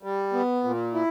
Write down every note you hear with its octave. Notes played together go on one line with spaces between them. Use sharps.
G3
B3
A#2
E4